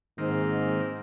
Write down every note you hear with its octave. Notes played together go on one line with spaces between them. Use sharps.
G#2 D#3 A#3 C4